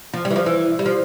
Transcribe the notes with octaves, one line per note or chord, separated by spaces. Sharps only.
F3
G3
E3
F3
E3
G3
F3